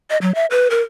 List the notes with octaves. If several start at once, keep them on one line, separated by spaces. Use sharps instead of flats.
D#5
F#3
E5
B4
A#4